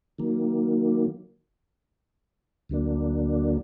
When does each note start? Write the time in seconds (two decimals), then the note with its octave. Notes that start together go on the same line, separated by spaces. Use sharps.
0.18 D#3 F#3 A#3
2.69 D2 D3 F#3 A#3 D4